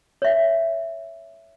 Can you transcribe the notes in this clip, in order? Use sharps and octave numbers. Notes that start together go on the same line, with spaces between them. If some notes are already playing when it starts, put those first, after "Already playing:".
C#5 E5